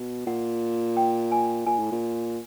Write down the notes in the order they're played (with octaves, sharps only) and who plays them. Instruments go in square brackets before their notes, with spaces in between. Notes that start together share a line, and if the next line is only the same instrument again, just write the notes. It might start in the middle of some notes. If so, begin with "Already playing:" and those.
Already playing: [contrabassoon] B2
[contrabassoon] A#2 [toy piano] F#5
[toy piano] G5
G#5
[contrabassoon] A#2 [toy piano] G#5
[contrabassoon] A2
A#2